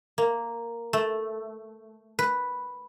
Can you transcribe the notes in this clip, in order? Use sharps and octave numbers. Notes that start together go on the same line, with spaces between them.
A#3
A3
B4